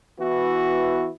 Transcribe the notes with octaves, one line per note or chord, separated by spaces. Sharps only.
E3 B3 E4 F#4